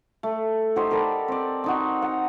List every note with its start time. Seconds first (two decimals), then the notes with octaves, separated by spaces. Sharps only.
0.23 A3
0.76 D#4 F#4 G4 C5
0.91 A4 A#4 D5 B5
1.28 C4 D5
1.64 C4 D#4 F#4
2.02 F#5 A#5